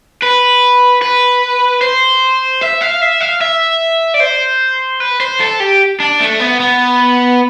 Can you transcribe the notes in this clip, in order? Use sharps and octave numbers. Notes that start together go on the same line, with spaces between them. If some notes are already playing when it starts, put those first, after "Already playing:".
B4
B4
C5
E5
F5
E5
F5
E5
D5
C5
B4
C5
A4
G4
D4
A3
B3
B3